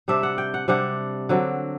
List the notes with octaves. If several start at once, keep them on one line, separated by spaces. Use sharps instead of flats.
C3 G3 D4 E5
F#5
G5
F#5
C3 G3 D4 F#5
D3 F#3 C4